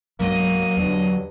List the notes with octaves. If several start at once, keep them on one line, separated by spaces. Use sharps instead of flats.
B1 G2 F#3 G#3 A#3 D#5
E2 G2 D3